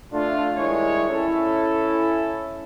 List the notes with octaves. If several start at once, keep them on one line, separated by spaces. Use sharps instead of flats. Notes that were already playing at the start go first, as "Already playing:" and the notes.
A3 D4 F4
D#3 G3 G#3 E4 C#5
C#4 E4 A4